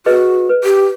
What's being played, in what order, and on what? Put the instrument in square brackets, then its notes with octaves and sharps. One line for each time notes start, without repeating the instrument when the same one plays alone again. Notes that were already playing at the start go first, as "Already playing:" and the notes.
[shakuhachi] F#4 [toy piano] G#4 B4 D#5
[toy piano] B4
[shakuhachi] G4